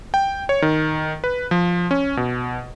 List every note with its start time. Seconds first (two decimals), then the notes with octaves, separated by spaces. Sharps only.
0.14 G5
0.49 C#5
0.62 D#3
1.24 B4
1.51 F3
1.91 C#4
2.17 B2